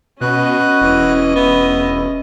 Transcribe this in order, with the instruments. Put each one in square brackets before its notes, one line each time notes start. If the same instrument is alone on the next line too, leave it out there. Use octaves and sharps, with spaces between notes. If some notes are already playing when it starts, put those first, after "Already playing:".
[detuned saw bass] B2 [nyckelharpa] C#4 D#5 [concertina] F#4 B4 F#6
[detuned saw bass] E1 [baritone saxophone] E3
[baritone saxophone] B3 [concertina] E4